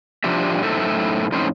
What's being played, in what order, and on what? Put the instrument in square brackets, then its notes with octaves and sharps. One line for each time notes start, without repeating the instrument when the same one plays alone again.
[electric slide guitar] F3 D4 F4 G4 E5
F#2 A2 D#4 A4 C5 E5
F2 A2 C#4 D#4 C5